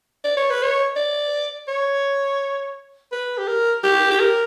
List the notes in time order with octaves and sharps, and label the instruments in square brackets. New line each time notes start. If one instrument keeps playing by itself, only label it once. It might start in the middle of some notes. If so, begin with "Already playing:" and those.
[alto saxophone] D5
C#5
B4
C#5
D5
C#5
B4
G4
A#4
G4
G4
A#4